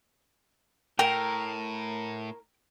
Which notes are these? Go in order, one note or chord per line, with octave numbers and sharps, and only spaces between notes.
A2 A#4 G5